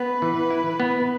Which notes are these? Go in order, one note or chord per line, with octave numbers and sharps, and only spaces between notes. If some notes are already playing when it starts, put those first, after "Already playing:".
Already playing: B3 B4
E3
E4
B3